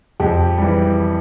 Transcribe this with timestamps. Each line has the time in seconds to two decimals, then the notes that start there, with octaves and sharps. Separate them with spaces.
0.20 F2 G4
0.58 E3 G3